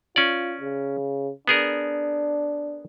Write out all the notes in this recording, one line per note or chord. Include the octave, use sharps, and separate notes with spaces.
C#4 F4 D5
C#3
B3 D4 G#4 A#4